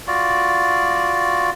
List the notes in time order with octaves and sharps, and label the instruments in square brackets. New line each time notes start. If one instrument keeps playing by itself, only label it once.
[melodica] F4 F#4 D5